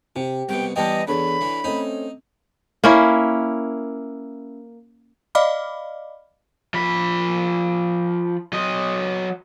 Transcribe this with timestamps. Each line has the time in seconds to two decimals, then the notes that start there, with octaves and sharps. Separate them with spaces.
0.16 C3 G4
0.49 C2 B2 G5
0.76 E3 G3 B3 D#5 G5 A5 G6
1.08 E2 D4 A4 C#5 B5
1.41 E3
1.64 A3 C4 C#4 D#4
2.84 A#3 C#4 E4
5.35 D5 D#5 F5 B5 D6 F6
6.74 F3 B5
8.53 F#3 D#5